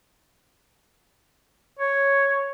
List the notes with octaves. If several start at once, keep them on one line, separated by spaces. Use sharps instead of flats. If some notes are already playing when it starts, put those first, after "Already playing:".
C#5